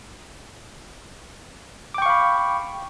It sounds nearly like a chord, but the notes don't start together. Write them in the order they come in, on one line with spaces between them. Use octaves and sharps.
D6 G5 C#6 F5 B5